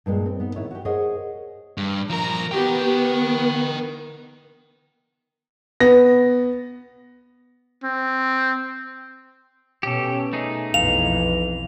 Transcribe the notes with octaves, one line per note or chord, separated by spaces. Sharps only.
G2 A#2 G#3
C4
B3 D#4
A2 D#3 E4 B4 C#5
F#4 G4
G#4 A#4 C5 C#5 D#5 F#5
G2
F3 A#4 A#5
B3 G4 A#4 G5
B3
B3 A#6
C4
B2 C#4 G4 A4
A3 D#4 G#4
B1 F2 E3 F5 F7